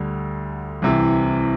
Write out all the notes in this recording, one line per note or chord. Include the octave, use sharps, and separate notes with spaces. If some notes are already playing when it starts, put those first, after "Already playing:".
Already playing: D2 D3 G3
C2 C3 E3